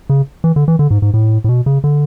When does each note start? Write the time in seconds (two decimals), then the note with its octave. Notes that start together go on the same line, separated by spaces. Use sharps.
0.10 C#3
0.44 E3
0.56 D3
0.68 E3
0.79 D3
0.91 G#2
1.02 G#2
1.14 A2
1.44 A2
1.49 B2
1.66 C#3
1.84 D3